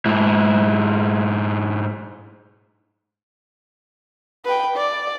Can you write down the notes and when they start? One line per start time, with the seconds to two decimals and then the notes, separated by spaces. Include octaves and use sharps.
0.06 G#2 E4
4.45 B4 G5
4.76 D5